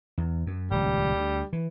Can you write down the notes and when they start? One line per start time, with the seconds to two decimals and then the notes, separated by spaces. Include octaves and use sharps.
0.18 E2
0.47 F#2
0.71 D#1 C#2 F3 G3
1.14 D2
1.53 E3